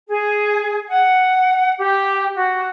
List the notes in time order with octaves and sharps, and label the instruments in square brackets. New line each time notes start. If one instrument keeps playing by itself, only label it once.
[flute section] G#4
F#5
G4
F#4